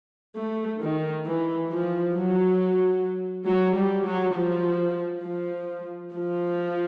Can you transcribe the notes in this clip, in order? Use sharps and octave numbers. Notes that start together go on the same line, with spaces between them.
A3
D#3
E3
F3
F#3
F#3
G3
F#3
F3
F3
F3